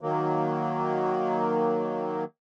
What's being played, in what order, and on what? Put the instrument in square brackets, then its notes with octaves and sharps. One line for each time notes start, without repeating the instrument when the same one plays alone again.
[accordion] D#3 F#3 A#3